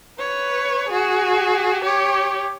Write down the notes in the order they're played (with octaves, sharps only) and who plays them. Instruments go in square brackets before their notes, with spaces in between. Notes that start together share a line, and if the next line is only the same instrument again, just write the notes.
[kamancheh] B4 C#5
F#4 G#4
G4 C#5